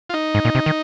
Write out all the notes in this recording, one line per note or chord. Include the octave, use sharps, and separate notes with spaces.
F4
D#4
G#2
A#2
C3
D#3